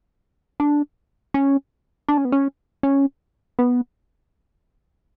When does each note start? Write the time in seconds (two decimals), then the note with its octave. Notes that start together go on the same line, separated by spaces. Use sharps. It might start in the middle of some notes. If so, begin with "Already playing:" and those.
0.60 D4
1.34 C#4
2.09 D4
2.17 C#4
2.25 B3
2.32 C#4
2.83 C#4
3.59 B3